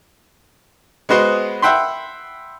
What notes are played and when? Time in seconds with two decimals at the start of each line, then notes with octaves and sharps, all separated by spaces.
1.09 G#3 B3 F#4 C5 D#5
1.62 E5 F#5 G5 B5 C6